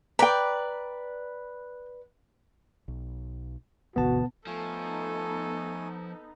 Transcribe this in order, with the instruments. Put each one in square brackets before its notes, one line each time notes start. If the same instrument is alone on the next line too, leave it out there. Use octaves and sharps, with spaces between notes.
[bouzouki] B4 D5 [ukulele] G5 A#5
[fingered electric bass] B1
[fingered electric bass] G1 D2 E3 [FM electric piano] B2 [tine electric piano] B3 A5 [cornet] F#4
[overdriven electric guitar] F3 [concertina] A3 G#5 [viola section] B3 D#4 [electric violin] A4